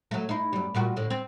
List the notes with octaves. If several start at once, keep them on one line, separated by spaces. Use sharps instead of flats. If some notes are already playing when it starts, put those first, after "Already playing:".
F#3 A3
D#4 E4
F#2 G3
A#2 G3 F#4
A2 D3
C4